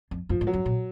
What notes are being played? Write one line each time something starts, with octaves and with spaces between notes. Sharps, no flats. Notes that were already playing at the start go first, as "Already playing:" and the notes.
F2
F#2 F3
G#2
F#3
F#2
A#2